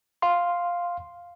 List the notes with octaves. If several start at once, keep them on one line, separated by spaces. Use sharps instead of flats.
F5 C6